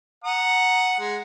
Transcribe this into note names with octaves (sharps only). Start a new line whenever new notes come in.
F#5 A#5 D#6
G#3